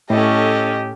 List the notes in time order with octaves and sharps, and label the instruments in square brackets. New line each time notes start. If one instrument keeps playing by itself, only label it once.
[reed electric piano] A2 [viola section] C#4 A4 [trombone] G4 [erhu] D#5